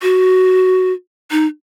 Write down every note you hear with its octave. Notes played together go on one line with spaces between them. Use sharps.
F#4
D#4